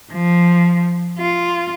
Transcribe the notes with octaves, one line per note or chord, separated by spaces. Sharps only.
F3
F4